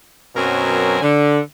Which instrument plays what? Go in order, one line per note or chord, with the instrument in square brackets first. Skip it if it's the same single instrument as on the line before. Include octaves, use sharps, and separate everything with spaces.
[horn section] F#2 B2 F#3 C4 A#4 G#5
D3